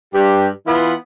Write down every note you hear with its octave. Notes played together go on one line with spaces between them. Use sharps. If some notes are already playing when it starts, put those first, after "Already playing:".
G2 G4
E3 B3 E4 F4